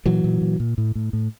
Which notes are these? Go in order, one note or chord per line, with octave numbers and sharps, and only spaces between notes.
A#2 E3 F#3
A#2
A#2
A#2
A2
A2
A2